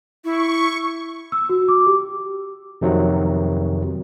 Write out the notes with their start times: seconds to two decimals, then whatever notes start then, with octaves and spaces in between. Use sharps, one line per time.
0.24 E4 C#6
1.32 E6
1.49 F#4
1.68 D6
1.87 G4
2.81 F2 C3 D#3 F#3